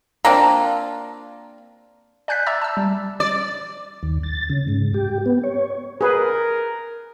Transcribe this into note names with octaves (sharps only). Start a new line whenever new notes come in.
A#3 C4 D4 F4
D5 G#5 F#6 G6 B6
E5 A#5 D6 E6 A6
A5 E6
G3
D5
D#2
A6
C#3
G#2
G4
B3
C#5
G#4 A#4 B4